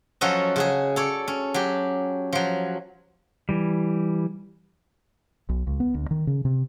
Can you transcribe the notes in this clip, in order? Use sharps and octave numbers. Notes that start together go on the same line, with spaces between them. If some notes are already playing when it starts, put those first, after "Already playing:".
F3 F#3 C#4 F#4 A4 D#5
C#3 F#4 G#4
A4 C#5 D5
C#4
F#3 G4
F3 F#3
E3 G3
B1
C#2
B3
D2
D#3
C#3
C3